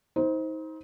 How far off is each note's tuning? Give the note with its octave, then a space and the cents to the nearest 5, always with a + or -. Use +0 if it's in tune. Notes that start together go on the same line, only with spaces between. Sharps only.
D#4 +35 C5 +0